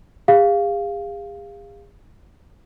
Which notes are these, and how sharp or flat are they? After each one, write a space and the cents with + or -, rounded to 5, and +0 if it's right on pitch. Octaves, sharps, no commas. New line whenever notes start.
G#4 -45 F5 +0